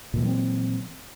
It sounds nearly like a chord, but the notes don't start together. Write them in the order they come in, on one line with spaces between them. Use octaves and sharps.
A#2 E3 F#3 C4